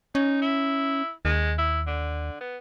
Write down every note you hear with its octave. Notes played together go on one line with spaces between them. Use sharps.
C#4 D#4
E4
D#2 G#3
E4
D3
B3